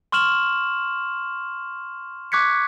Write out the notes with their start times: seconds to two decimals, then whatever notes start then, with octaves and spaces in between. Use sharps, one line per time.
0.12 C6 C#6 F6 E7 F#7
2.32 C#6 D6 F#6 G#6 B6 C#7